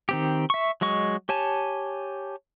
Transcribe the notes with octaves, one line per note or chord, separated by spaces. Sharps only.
D#3 C4 G4
E5 C#6
F#3 G#3 D#5 C#6
G4 C#5 G#5 A5